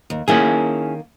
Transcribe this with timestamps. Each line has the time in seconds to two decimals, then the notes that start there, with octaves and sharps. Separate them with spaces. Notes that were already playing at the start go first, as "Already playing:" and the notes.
0.10 D#2
0.28 D#3 A#3 C#4 E4 G#4